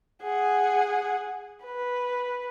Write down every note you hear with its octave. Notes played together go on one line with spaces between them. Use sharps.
G#4 F#5
B4